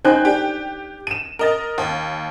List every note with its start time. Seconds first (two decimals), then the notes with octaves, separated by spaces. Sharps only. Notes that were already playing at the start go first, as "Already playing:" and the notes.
0.05 C#4 D#4 C5 G5 G#5 F#6
0.25 D4 G4 G5
1.07 D#7 E7
1.39 A#4 D#5 A6
1.78 D#2